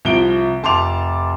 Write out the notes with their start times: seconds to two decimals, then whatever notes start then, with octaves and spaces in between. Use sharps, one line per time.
0.05 C2 F3 D7 G7
0.63 F1 A5 C6 D6 F7